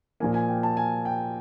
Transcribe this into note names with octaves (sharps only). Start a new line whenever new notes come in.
A#2 F3 A#3 G#5
G#5
G5
A5
G#5
G5